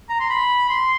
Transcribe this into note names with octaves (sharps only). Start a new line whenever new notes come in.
A#5
C6
B5
C6